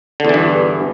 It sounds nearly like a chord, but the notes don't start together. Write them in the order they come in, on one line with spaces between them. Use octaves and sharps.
D3 E2 E3 G2